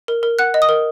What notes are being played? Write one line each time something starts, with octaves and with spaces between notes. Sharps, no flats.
A#4
A#4
F#5 F#6
D#5
D#6
A#4